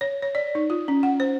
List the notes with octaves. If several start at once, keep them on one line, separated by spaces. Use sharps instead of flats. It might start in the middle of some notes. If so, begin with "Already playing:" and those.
C#5
C#5
D5
D#4
F4
C#4
F#5
C5